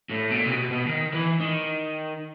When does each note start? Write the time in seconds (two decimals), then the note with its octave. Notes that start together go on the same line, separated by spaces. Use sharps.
0.10 A2
0.31 B2
0.36 A#2
0.47 C3
0.54 B2
0.71 B2
0.88 D#3
1.14 E3
1.40 D#3